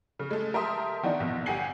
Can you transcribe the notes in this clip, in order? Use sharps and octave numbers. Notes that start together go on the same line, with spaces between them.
C#3
G#3 A3
G4 A#4 E5 A5 C6 D#6
D#3 E3 B3 D4 D#4
A#1 B2
G1 G4 F#5 G#5 C7 F#7